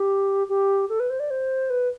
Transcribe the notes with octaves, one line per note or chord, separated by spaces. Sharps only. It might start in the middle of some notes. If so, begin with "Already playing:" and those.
Already playing: G4
G4
A4
B4
C5
D5
C5
B4